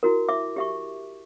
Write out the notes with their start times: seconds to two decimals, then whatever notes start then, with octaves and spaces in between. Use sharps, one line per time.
0.03 E4 F#4 A#4
0.29 E5 D6
0.56 G4 E5 C#6